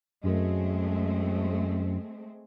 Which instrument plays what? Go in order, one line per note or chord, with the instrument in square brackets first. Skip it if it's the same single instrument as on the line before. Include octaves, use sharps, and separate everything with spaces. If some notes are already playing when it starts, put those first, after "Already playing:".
[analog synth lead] F#2 [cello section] G#3 A3 C4